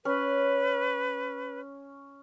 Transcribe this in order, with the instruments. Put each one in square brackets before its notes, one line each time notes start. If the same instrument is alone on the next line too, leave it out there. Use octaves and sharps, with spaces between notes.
[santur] C#4 [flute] B4